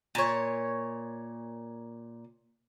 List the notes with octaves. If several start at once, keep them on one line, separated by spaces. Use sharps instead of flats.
A#2 C#5